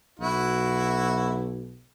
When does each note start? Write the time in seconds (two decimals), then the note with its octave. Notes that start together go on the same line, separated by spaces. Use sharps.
0.20 B1 E4 F#4